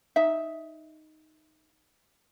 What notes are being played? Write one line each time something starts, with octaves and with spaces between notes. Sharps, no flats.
D#4 E5